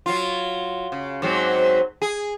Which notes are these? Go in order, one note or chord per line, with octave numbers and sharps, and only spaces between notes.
F#3 F4
C#3
G#2 F#3 C4
G#4